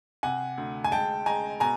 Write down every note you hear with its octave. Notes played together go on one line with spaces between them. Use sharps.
C3 F#5 G#5
D2
G#5
G#3 G5 A5
G#3 G#5 A#5
B2 G#5 A#5